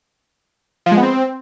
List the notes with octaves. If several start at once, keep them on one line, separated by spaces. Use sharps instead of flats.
F3
G#3
B3
C4